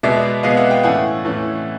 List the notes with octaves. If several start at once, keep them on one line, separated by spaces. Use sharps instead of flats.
B2 G#3 B3 D5 E5
B2 G#3 B3 D#5 F5
E5 F#5
F5 G5
A2 E3 A3 C#4 F#5 G#5
A2 E3 A3 C#4